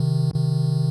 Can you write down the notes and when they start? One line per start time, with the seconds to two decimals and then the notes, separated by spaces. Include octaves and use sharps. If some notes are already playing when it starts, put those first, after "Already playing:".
Already playing: C3 D#3
0.34 C3 D#3